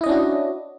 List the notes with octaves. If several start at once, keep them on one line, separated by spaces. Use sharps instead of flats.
C#4 D4 E4 F#4 D#5